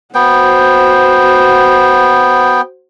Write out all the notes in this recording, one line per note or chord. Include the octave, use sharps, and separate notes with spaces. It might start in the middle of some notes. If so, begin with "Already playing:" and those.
B3 F#4 C5 G5